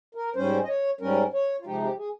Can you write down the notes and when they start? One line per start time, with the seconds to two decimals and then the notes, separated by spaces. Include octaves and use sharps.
0.15 A#4
0.35 G#2 G3 C#4 C5
0.63 D#5
0.68 C#5
1.01 G#2 G3 C#4 A#4
1.34 C#5
1.60 F4
1.65 C3 F3 G#3 D#4 G4
1.81 G4
1.98 G#4